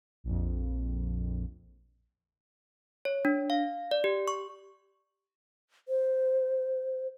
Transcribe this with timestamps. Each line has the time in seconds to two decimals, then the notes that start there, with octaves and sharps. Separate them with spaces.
0.24 A#1 F2
3.05 C#5
3.25 D4
3.50 F5
3.91 D5
4.04 G4
4.28 C#6
5.88 C5